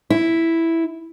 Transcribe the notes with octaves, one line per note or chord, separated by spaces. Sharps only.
E4